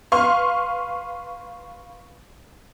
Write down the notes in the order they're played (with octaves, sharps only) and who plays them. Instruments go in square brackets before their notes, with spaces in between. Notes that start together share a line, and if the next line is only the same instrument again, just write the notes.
[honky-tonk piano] B4 F5 C6 C#6